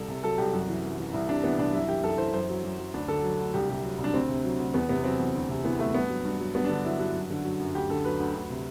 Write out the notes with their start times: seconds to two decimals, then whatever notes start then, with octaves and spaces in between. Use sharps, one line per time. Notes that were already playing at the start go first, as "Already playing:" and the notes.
Already playing: C2 A4
0.08 C3
0.23 F#3 A4
0.38 C2 G4
0.53 F#2 F#4
0.68 E3
0.84 F#2
0.98 E3
1.13 C2 E4
1.28 C3 D4
1.44 E3 B3
1.59 C2 D4
1.73 F#2 E4
1.89 E3 G4
2.03 F#2 A4
2.18 E3 C5
2.33 F#2 C5
2.49 F#3
2.63 F#2
2.79 F#3
2.94 D2 D4
3.08 D3 A4
3.24 F#3
3.39 D2
3.54 C2 G4
3.69 C3 G4
3.83 F#3
3.98 C2
4.04 D4
4.14 D2 C4
4.29 C3
4.44 F#3
4.60 D2
4.74 E2 B3
4.89 C3 B3
5.04 F#3 C4
5.20 E2
5.35 D2
5.49 C3
5.64 E3 B3
5.79 D2 A3
5.94 G2 B3
6.09 F#3
6.25 G2
6.39 F#3
6.55 G2 B3
6.65 D3 D4
6.85 F#3 E4
6.99 G2 F#4
7.15 F#2
7.30 D3
7.44 F#3
7.59 F#2
7.75 D2 G4
7.90 D3 A4
8.05 F#3 B4
8.20 D2
8.35 D2
8.50 C3